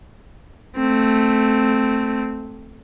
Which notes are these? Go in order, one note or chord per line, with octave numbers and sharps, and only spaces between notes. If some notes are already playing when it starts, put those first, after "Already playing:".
A3 C4